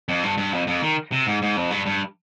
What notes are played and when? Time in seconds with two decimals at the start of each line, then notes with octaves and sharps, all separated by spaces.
0.09 F2
0.23 G2
0.37 G2
0.53 F2
0.67 F2
0.82 D#3
1.12 C3
1.27 G#2
1.42 G#2
1.57 F2
1.71 G2
1.86 G2